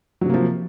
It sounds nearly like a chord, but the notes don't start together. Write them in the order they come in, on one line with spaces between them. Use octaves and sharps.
F#3 C3 A#3 F3